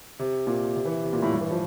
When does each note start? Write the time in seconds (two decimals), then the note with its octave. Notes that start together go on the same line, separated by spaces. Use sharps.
0.19 C3
0.47 A#2
0.75 C3
0.85 E3
1.03 C3
1.13 A#2
1.23 A2
1.32 G2
1.41 E3
1.51 F3